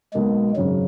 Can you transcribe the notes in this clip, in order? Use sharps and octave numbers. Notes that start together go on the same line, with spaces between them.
B1 B2 G#3 A#3
G#1 F#2 C#3 F#3